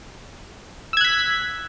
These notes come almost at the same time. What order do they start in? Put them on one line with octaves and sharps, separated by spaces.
E6 G#6 F#6 B6